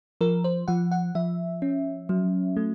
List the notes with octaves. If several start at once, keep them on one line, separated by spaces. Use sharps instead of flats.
F3 A#4
C5
F3 F#5
F#5
F3 E5
C#4
F#3
A3